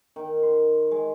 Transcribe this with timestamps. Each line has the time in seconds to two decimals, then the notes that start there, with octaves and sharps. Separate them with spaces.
0.16 D#3
0.43 C6
0.91 G#3